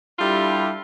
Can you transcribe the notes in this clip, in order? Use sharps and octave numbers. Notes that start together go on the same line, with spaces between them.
G3 D4 E4 F4 G4 A4